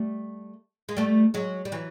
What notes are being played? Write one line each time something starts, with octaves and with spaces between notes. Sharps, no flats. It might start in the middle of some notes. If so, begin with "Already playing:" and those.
Already playing: G3 A3
G#3
G3 A3
F#3 G#3
G3
E3 F#3